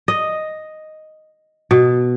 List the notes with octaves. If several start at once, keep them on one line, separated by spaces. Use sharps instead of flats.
D#5
B2